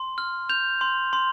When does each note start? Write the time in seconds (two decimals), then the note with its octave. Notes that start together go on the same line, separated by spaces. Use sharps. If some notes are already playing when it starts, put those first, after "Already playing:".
Already playing: C6
0.18 F6
0.49 G6 F7
0.81 C6
1.13 C6